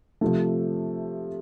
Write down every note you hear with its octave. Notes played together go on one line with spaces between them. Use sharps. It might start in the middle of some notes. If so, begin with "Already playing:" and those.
C3 F3 A3